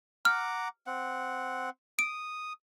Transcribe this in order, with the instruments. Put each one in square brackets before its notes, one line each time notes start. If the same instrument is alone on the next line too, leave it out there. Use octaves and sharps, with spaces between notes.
[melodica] F#5 A#5 D6 [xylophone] F6
[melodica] C4 F#5
[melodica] D#6 [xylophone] D7